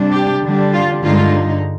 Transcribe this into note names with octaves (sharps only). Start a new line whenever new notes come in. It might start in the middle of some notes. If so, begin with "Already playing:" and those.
Already playing: C3 G3 D4
G4
D3 G3 D4
F4
G2 D3 G#3 D#4 F4